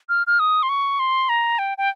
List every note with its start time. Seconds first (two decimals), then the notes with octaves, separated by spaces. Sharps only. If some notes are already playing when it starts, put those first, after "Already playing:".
0.09 F6
0.27 F6
0.40 D#6
0.63 C6
0.69 C#6
0.99 C6
1.29 A#5
1.59 G5
1.78 G5